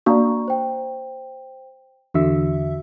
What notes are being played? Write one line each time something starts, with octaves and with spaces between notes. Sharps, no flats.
A#3 D4 F#4 D5 A#5 C#6
C5 G5
E2 D3 F#4 E5